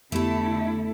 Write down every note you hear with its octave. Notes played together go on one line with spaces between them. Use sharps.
F2 D3 A3 B3 E4 G4 A4